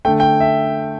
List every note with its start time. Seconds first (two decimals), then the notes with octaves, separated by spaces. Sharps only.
0.05 D3 A3 G5
0.20 G5
0.40 E5